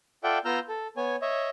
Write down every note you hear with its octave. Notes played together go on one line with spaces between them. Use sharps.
F4 A4 D5 E5 F#5 G5
B3 F4 A#5 E6 F6 G6
A4
B3 C#5 G#5
C#5 D#5 E5